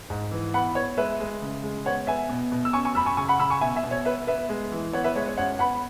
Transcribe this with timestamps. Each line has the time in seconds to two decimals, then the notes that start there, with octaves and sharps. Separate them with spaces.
0.10 G#2
0.31 E3
0.54 B3 F#5 B5
0.75 B3 C#5
0.97 G#3 B4 E5
1.20 G#3
1.42 C#3
1.63 G#3
1.85 B3 C#5 F#5
2.07 B3 E5 G#5
2.29 B2
2.52 B2
2.65 E6
2.73 C#4 G#5 C#6
2.85 G#5 C#6
2.95 F#2 B5 E6
3.06 G#5 C#6
3.17 C#3 G#5 C#6
3.28 F#5 B5
3.39 C#3 B5 E6
3.50 G#5 C#6
3.61 B2 E5 G#5
3.76 E5 G#5
3.84 B2
3.91 C#5
4.05 B3 B4 E5
4.27 B3 B4 E5
4.49 G#3
4.72 E3
4.93 B3 C#5 F#5
5.04 B4 E5
5.15 G#3 C#5
5.27 C#5
5.37 F#2 C#5 F#5
5.59 B3 F#5 B5